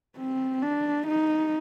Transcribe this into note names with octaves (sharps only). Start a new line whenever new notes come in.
C4
D4
D#4